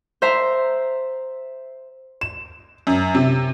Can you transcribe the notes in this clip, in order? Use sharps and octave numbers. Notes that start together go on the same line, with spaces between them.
C5 E5 A#5
E7
F#2
C3